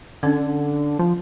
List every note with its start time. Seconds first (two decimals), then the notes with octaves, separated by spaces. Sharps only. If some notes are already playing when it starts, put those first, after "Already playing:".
0.23 D3 C#4 D4
0.99 F3